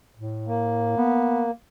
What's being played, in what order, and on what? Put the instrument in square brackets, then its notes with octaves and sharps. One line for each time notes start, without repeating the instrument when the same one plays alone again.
[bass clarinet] A2
[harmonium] A#3
[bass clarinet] B3